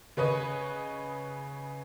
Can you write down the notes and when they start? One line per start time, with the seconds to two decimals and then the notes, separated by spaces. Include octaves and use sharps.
0.17 C#3 B4 C#5 D#5 D#6 D#7